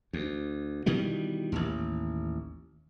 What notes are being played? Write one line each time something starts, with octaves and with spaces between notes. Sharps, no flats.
D2
B2 D#3 E3 G3
A1 D#2